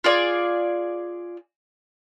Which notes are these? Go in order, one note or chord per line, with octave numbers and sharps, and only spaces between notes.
F4 G#4 D5